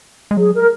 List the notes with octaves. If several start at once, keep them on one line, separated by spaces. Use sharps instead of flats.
G#3
F#3 G#4
A#4